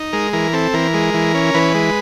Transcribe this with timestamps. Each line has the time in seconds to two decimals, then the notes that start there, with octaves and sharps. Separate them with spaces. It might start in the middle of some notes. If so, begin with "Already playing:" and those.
Already playing: D#4
0.13 G#3 A#4
0.33 E3 A#4
0.53 C4 A4
0.74 E3 A#4
0.94 G#3
1.14 E3
1.34 C#4
1.54 E3 B4
1.74 G#3